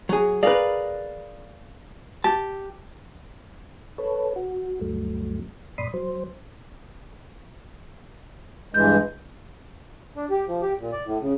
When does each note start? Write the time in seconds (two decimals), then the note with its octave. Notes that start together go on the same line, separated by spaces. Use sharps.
0.09 F#3 G#4
0.43 G#4 A#4 B4 D5 F5
2.24 G4 A5
3.98 A4 B4 C#5
4.36 F#4
4.81 D2 G2 F#3 A3
5.78 F#2 A#2 D5 B5 C6 D#6
5.94 F#3 C5
8.74 G2 E3 G#3 G6
10.16 D4
10.31 G4
10.48 F3
10.62 G4
10.80 A#2
10.92 D5
11.05 A2
11.21 C#3